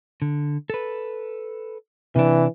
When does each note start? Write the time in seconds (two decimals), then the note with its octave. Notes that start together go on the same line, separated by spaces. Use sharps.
0.22 D3
0.70 A4 B4
2.16 C3 E3 D4